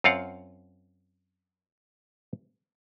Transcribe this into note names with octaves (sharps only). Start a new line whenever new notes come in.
F#2 C4 F4 F5 F#5